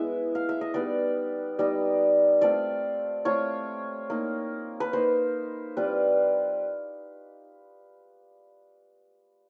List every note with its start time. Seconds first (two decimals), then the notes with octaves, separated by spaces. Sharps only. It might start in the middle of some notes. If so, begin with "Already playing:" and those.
Already playing: G#3 B3 E4 E5
0.35 F5
0.49 E5
0.61 D#5
0.74 G3 B3 D#4 D5
1.59 G3 B3 D#4 D5
2.41 A3 C4 F4 D5
3.25 A3 C4 F4 C#5
4.10 A#3 D#4
4.80 B4
4.93 A#3 D#4 C5
5.77 G3 C4 F4 B4